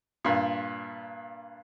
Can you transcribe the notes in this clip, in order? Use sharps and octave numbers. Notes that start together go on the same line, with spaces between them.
G2 A#2